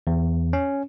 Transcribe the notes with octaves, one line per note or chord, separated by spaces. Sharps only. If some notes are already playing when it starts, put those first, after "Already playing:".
E2
C#4